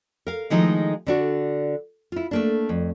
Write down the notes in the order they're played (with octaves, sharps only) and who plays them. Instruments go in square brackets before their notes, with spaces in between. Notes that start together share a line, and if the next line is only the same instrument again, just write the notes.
[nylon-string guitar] A#4 F5
D#3 F3 G#3 A3 D#4 E4
D3 D4 F#4
E4 F4
A3 A#3 D4
F2